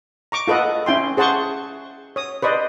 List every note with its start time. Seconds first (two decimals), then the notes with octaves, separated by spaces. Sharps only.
0.32 A#5 C#6 D6
0.47 F4 A4 B4 D#5 F#5
0.86 C#4 E4 G5 C6
1.17 G#4 C5 F#5 A5 C6 C#6
2.16 C#5 D#6
2.42 B4 C5 D5 D#5